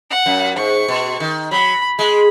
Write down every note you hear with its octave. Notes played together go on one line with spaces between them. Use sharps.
F#5
F#2
G#2 C#6
B2
D#3
F#3 B5
G#3 B5